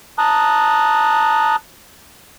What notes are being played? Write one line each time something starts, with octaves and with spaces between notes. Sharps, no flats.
A5 A#5 D#6 F#6